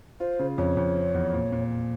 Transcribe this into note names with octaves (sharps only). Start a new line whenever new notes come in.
F4 C5
C#3
F2 C#5
F2
C4
E2
A#2
A#2